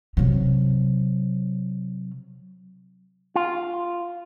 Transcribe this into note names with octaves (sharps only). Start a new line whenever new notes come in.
C3 F#3
F4